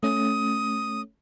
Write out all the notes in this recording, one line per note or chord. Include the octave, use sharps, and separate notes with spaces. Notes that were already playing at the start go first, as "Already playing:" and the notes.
A3 C#4 D#6